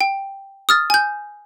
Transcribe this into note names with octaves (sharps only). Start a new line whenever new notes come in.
G5
D#6 F6 A6
G#5 G6